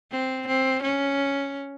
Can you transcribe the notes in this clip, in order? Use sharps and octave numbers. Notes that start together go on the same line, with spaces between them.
C4
C4
C#4